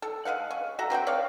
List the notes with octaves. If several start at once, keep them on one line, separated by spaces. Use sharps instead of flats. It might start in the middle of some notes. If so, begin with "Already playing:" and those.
A4
G#3 E4 F5 F#5
C#4
F#4 A4 E5 A#5
D3 C4 F#4 G5
C#5 D5 F5